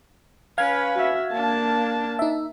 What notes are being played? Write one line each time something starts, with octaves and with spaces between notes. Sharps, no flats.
C#4 B4 F5 F6 G#6
F#4 E5
A#3 D4 A5
D#4 E5